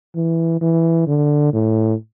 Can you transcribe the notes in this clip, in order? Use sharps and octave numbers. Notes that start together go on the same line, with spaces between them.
E3
E3
D3
A2